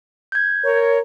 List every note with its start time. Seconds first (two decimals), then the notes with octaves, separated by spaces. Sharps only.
0.32 G6 G#6
0.64 A#4 C#5